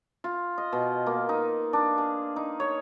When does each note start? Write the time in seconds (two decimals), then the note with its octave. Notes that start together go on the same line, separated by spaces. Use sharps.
0.24 F4
0.58 D#5
0.73 B2
1.06 A#3
1.29 D#4
1.73 D4
1.98 G#4
2.36 D#4
2.60 C#5